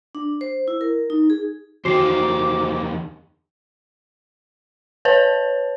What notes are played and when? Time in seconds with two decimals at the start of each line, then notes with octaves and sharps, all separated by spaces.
0.15 D4
0.41 C5
0.68 E4
0.81 A#4
1.10 D#4
1.30 G#4
1.85 E2 D#3 F#4 C5 D6 C7
5.05 B4 C#5 A5